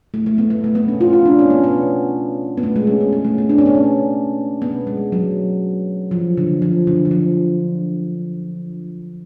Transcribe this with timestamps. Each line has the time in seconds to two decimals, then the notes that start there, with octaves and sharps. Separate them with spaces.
0.14 A3
0.26 A3
0.38 B3
0.50 B3
0.64 A3
0.75 B3
0.88 C#4
1.00 F4
1.13 F4
1.26 D4
1.39 C#4
1.50 B3
1.64 B3
2.58 B3
2.63 A3
2.76 G#3
2.87 C#4
3.01 B3
3.13 G#3
3.25 A3
3.38 B3
3.49 D4
3.58 C#4
3.66 B3
3.75 C#4
4.62 B3
4.87 G#3
5.12 F#3
6.11 F3
6.37 D3
6.62 F3
6.87 D3
7.05 D3
7.11 F3